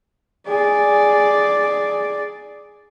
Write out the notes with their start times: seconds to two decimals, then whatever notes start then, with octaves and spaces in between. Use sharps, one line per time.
0.48 G#4 D5